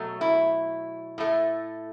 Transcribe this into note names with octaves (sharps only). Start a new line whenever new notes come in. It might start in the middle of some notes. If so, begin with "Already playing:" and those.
Already playing: B2 F#3 A3
E4
A2 A3